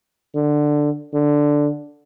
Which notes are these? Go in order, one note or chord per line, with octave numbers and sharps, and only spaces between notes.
D3
D3